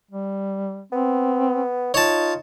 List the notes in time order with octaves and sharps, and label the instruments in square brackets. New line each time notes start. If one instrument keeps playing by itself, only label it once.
[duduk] G3
[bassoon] B3 [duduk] C4
[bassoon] D#4 [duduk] F4 [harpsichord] C#5 A5